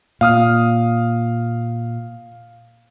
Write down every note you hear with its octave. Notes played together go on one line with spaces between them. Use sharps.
A#2 F5 D#6 F6